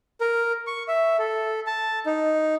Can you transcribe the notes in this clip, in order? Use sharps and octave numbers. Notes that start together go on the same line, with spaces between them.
A#4
C#6
E5
A4
A5
D#4